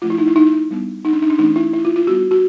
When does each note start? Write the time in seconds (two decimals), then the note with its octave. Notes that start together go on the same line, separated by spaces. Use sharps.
0.02 F3 A3 D4 F4
0.10 E4
0.18 D#4
0.28 E4
0.36 D#4
0.71 G3 B3 D4
1.05 D#4
1.13 D4
1.22 D#4
1.30 D4
1.38 E3 A3 C#4 D#4
1.56 E4
1.73 E4
1.85 F4
1.96 F4
2.07 G3 B3 D4 F#4
2.31 F#4